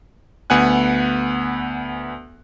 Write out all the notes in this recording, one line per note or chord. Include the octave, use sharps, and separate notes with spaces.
D2 B3 F#5 G#5 F#6